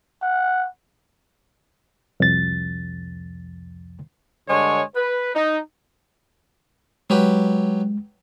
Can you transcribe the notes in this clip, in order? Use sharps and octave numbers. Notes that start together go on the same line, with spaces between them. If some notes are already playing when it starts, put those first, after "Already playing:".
F#5
C2 F2 A6
G2 D3 G#3 C#5
B4
D#4
F#3 G#3 G4 B4